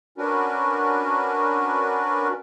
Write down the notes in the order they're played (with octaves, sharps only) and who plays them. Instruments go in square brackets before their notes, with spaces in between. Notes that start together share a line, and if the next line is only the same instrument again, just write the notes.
[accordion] C#4 D4 F#4 A#4 B4